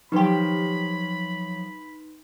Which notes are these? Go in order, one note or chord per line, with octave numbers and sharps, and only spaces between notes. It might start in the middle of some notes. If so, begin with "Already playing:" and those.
D#3 F3 F#3 D#4 G4 B4 B5 C6